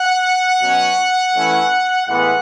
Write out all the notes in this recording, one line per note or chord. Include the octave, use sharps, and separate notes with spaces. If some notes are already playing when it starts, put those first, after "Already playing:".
Already playing: F#5
B2 F#3 C#4
E3 A3 C#4 E4
A2 E3 G#3 B3 F#5